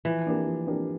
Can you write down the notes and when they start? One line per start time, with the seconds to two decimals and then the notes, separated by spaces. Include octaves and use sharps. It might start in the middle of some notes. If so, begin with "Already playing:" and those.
0.05 E3 F3
0.26 A#3 D4 G4 A#4
0.47 F3
0.67 A#3 D4 G4 A#4